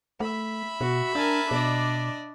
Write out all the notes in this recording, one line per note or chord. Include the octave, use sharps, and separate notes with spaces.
A3 E5 B5
B2 F#4
D4 A#4 G#5 A5
B2 D4 D5 D#5